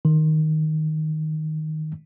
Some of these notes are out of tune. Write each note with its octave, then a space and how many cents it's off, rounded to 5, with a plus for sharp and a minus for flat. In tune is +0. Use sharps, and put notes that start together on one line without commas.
D#3 +0